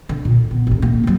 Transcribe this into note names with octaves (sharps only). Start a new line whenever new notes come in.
D3
A#2
B3
A1 D2
D3 A#3
F#3 G3